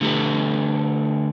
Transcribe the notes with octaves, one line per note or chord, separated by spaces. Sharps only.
D3 A3 G4 A4 B4